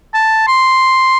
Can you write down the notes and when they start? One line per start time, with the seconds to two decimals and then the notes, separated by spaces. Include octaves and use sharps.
0.14 A5
0.48 C6